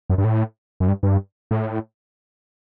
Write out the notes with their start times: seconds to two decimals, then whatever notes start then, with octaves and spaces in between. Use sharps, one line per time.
0.10 F#2
0.18 G2
0.24 A2
0.80 F#2
0.88 G2
1.03 G2
1.51 A2